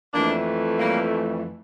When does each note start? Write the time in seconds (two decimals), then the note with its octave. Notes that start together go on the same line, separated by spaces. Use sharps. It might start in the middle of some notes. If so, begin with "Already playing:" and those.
0.14 F2 E3 A3 A#3 D4
0.79 G3 A#3